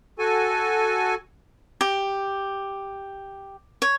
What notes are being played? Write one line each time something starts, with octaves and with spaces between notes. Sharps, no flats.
F#4 A4 G#5
G4
C#5